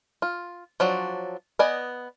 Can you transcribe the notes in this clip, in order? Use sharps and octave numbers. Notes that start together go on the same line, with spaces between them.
F4
F3 F#3 D4
B3 D5 D#5 G#5